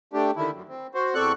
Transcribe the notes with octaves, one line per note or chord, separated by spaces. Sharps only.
A3 D4 G4
D3 D#3 E4
F#2
C4
F#4 C5
E2 C4 A4 D5 C#6 F#6